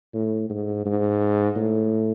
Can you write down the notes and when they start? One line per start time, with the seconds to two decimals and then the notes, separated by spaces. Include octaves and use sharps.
0.14 A2
0.50 G#2
0.86 G#2
1.56 A2